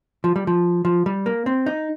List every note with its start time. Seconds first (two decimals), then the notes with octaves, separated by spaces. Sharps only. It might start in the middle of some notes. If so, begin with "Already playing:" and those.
0.24 F3
0.36 G3
0.47 F3
0.85 F3
1.06 G3
1.26 A#3
1.46 C4
1.66 D#4